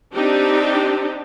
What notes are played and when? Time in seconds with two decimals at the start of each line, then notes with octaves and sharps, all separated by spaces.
0.13 C4 D4 D#4 G4